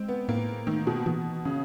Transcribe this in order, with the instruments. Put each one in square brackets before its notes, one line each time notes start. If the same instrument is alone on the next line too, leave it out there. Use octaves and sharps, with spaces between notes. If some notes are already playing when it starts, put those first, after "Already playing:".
Already playing: [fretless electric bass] G#3 [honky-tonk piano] C4
[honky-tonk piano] B3
[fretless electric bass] A2 [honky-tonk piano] A#3
[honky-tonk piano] D#3 [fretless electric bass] A3
[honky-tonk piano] B2
[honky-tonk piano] B2 [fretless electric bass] E3
[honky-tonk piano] C#3 [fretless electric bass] C#4